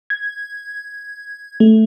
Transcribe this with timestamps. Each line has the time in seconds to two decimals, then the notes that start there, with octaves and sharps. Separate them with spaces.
0.10 G#6
1.60 A3